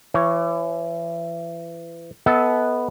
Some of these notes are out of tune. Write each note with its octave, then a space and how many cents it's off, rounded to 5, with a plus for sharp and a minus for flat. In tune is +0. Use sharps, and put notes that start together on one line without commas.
E3 +30 C#5 +0
B3 +0 A4 -10 D#5 +40